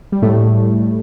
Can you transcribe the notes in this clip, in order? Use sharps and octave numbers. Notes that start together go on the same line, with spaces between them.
G3
A2 A3